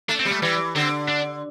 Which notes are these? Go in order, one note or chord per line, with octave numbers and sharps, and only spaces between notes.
A3 D4
C4
G3
A3
E3 G3
D3 C4
D4